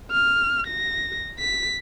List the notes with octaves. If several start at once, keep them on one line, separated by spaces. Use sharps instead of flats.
F6
A#6
B6